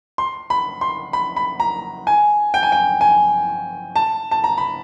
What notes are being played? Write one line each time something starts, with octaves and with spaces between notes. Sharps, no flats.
C6
B5
C6
B5
B5
A#5
G#5
G5
G#5
G5
G#5
A5
A5
A#5
B5